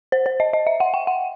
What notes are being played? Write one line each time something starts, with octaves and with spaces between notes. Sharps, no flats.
C5
C5
D#5
D#5
E5
F#5
G5
F#5